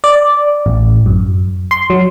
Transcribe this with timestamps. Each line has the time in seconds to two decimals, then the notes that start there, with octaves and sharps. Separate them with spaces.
0.04 D5
0.66 A1
1.06 F#2
1.71 C6
1.90 F#3